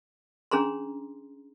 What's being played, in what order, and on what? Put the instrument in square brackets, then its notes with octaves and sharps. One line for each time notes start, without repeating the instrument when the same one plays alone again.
[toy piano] C#4 D4 G#4 A#5 C6